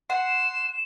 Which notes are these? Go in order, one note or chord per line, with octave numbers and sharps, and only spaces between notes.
F#5 C6 E7